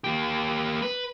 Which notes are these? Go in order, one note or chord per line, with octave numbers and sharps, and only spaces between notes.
A#3 G4
B4